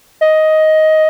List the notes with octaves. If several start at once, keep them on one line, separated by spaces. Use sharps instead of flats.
D#5